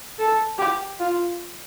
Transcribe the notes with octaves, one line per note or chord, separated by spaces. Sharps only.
A4
G4
F4